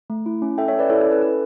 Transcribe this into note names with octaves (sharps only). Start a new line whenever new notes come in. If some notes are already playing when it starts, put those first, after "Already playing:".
A3
E4
C#4
A4 E5 G5
C#5 E5
C#4
B4 D5
E4 A4 C#5
A4
C#4
B4
A4 B4